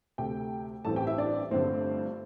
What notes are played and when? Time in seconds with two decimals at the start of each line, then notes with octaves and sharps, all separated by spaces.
0.18 D2 C3 A3 G4 G5
0.85 A1 G2 E3 C4 A4 A5
0.96 G4 G5
1.07 E4 E5
1.18 D4 D5
1.51 G1 G2 D3 A3 C4 C5